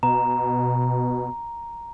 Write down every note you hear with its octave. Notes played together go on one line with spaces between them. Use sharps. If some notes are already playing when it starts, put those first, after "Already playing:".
B2 A#5